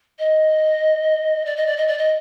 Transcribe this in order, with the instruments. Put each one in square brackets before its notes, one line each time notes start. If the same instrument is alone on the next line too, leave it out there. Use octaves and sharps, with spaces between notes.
[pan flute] D#5
D5
D#5
D5
D#5
D5
D#5